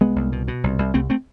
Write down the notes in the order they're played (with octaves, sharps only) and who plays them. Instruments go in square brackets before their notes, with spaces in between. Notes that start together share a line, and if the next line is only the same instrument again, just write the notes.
[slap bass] C2 G#3 B3
C2
B2
B2
C2
C2
C2 A3 C4
A3 C4